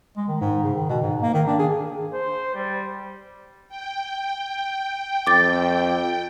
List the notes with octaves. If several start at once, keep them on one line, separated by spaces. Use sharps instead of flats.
G#3
D#3
G#2
C#3
D#3
B2
G#2
A#3
D#3
D4
G#4
C5
G3
G5
F2 D6 A6